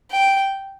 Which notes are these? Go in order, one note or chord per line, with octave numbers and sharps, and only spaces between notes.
G5